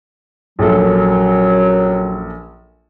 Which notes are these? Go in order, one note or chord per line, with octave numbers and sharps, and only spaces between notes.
A#1 F#2 F#3 A4